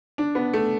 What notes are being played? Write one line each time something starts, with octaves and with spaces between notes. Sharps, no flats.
D4
B3
A3